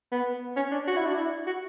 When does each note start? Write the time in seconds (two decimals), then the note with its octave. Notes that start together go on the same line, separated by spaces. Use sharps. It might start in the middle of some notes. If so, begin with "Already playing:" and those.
0.12 B3
0.56 C#4
0.72 D4
0.87 F#4
0.96 E4
1.06 D4
1.14 E4
1.47 F#4